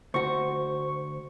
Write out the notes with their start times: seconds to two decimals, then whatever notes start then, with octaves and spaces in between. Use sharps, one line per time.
0.14 D2 F#4 C5 C#6